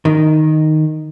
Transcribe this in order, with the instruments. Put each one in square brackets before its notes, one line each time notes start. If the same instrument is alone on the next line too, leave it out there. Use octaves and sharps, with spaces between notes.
[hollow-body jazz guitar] D#3